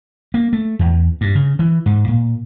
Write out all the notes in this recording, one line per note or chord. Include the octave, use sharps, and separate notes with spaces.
A#3
A3
E2
G2
C#3
E3
G#2
A#2